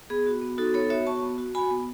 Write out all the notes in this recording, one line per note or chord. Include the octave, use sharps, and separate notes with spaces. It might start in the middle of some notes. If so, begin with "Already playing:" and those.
B3 G#4
F#4
B3
D#4 F#4 A4
B3 A4 C#5
F#4 C#5 E5
B3 A5 C#6
B3
F#4
F#4 G#5 B5
B3